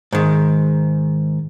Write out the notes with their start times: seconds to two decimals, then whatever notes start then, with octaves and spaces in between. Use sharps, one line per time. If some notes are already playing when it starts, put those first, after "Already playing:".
0.12 G#2 D#3